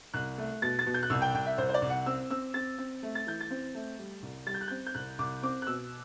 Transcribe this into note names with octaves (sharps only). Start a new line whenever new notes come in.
C2 F#6
A3
B2 A6
A6
B2
G6
F#6
C2 E6
G5
C2 G5
E5
C2 C5
C5
D5
C2
F#5
C4 E6
C4 E6
C4 A6
C4
A3
A6
E3 G6
A6
C4
A3
G3
C2
G3 A6
G6
F#6
C4 G6
G6
C2 F#6
C2 D6
C4 D6
F#6
B2 E6